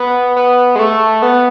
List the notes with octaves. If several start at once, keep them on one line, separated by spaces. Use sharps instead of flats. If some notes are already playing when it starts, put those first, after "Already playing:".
Already playing: B3
B3
G#3
A3
B3